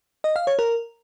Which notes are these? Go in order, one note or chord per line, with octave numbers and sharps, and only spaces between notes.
D#5
F5
C#5
A#4